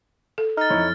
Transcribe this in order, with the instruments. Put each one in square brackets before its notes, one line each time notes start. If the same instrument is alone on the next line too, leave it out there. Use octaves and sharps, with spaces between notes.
[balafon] A4
[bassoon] D#4 [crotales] F6 A6
[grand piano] F2 E4 C#5